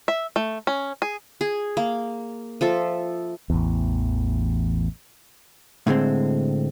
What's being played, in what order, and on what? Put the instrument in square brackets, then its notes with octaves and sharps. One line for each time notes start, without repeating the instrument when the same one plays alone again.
[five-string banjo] E5
A3
C#4
G#4
[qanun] G#4
A#3
F3 A4 E5
[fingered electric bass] A1 E2
[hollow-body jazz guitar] A2 D3 G#3 C4